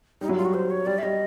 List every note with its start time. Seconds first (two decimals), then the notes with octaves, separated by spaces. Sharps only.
0.21 G3 D#4
0.29 F#3 E4
0.37 G3 F4
0.45 F#4
0.54 C5
0.70 C#5
0.86 G3 D5
0.98 E5
1.03 G3 D#5